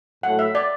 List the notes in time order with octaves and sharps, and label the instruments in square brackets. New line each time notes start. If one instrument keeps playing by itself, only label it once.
[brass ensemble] A2 F#3 A3 [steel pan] F#5
[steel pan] E5
D5